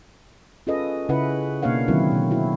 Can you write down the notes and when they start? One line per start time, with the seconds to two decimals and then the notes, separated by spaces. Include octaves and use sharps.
0.67 C#4 F4 G#4 A4 B4 D#5
1.09 C#3 C#4 E4 B4 F#5
1.62 B2 A#3 D4 C#5 F5 F#5
1.88 D3 D#3 F#3 C4 E4
2.12 B2
2.31 E4 F#4